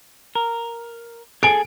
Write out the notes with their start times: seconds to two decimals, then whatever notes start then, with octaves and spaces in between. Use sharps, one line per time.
0.35 A#4
1.43 G#4 A4 G#5 D7